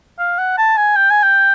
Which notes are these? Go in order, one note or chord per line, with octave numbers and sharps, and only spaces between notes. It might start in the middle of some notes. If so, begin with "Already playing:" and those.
F5
F#5
A5
G#5
G5
G#5
G5